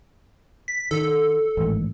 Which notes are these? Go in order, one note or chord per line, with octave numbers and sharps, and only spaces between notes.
B6
D#3 A4
A1 G#2 D#3